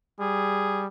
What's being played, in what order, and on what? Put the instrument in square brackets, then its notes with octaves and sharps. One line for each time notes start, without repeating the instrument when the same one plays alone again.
[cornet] G3 [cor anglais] G#4